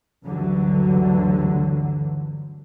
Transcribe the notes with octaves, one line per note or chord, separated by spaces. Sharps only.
D2 G2 D3 E3 F#3